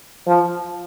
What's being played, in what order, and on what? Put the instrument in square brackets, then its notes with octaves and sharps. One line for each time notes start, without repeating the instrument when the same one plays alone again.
[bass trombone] F3